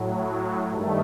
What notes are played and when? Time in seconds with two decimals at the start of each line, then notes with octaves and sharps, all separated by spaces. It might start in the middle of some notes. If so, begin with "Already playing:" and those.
Already playing: A2 F#3
0.70 G2 D#3 A3